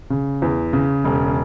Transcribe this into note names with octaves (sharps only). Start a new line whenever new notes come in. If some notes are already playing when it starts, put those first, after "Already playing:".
C#3
E2
C#3
E1